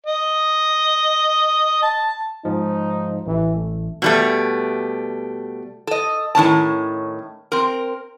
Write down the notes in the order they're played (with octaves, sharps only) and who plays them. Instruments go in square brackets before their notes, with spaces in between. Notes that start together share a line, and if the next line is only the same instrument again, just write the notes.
[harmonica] D#5
A5
[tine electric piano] G#2 F3 [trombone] D#4
[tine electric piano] A1 [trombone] E3
[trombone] A3
[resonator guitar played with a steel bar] B2 G3 A3
A4 D#5
A2 D#3 C#4 A5
C4 A#4